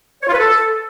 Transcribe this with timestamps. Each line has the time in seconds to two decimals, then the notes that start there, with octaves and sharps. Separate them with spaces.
0.22 C#5
0.28 F4
0.33 B4
0.39 A4